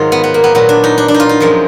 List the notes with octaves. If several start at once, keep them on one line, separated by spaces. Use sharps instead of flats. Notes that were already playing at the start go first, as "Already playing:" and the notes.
Already playing: G#2 D#3 F#3 D#4 F4
B3
B3
A#3
B3
A#2 F#3 B3
D4
D#4
D4
D4
D#4
F4
D#4
F#2 F3 G#3